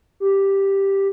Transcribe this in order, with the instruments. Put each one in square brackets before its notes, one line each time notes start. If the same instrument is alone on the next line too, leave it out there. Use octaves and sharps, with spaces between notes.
[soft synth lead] G4